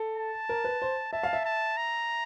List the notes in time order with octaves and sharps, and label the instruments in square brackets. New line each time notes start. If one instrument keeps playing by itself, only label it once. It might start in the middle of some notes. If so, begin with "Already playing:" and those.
Already playing: [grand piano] A4
[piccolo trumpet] A5
[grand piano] A#4
B4
C5
[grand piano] E5 [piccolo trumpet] A5
[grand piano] F5
E5
[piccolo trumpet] A5
A#5